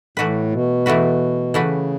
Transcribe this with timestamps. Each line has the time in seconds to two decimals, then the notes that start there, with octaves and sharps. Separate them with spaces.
0.17 A2 E3 A3 F#4 B4
0.52 B2
0.86 E3 A3 F#4 B4
1.54 C#3 E3 A3 F#4 B4